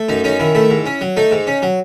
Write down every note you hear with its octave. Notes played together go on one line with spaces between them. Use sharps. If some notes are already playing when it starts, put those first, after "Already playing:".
Already playing: A3
F#2 D#4
C#4 D#4
D#3 E4
A3 E4
G#2
C#4
F#3
A3 D#4
G#2
C#4
F#3